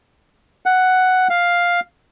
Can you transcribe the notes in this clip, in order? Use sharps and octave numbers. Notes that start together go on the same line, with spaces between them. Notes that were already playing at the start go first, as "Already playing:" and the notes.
F#5
F5